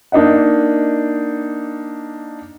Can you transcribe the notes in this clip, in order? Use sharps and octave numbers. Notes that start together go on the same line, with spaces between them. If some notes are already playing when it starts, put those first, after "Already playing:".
A#3 D4 D#4 D#5 F#5